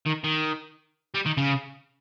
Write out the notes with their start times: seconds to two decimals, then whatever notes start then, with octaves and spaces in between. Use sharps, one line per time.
0.06 D#3
0.24 D#3
1.15 G3
1.26 D#3
1.37 C#3